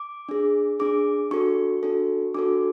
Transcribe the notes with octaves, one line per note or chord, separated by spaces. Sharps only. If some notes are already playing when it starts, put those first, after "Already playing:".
Already playing: D6
D4 G#4
D4 G#4 D6
D4 F#4 A4 C#6
D4 F#4 A4
D4 F#4 A4 D6